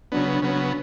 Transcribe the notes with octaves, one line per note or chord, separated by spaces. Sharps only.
C#3 F#3 B3 D4
C#3 F#3 B3 C#4